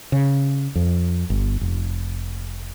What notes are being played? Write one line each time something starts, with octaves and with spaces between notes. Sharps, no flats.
C#3
F2
G1
F1